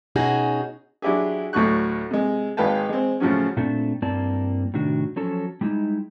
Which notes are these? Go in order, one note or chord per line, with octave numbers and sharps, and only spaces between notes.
B2 C#4 D#4 F#4 G#4
F#3 D4 E4 G4 G#4
D2 A2 F#3 C#6 F#6
C3 G#3
G#1 G#3 B4 F5 G5 A5
G#3 C4
A2 C#3 F3 F#3 C#4
A#2 A3 C4 D4
G2 A#3 C4 E4 D5 A5
A2 C3 D#3 D4 F#4
F3 F#3 C#4 A4
G3 G#3 D#4 E4